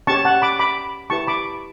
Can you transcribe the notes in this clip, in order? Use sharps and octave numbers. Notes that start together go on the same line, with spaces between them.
C#4 G4 C#5 A5 C#6
F#5 A5
B5 D6
B5 D6
E4 G4 B4 A5 C#6
B5 D6